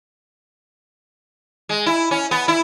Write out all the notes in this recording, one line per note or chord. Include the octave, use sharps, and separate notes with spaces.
G#3
E4
C#4
B3
E4